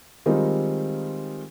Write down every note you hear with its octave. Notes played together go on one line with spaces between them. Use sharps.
D#3 G3 G#3 C4 D#4 F4